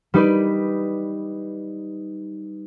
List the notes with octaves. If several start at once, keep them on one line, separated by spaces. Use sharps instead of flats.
G3 D#4 B4 D5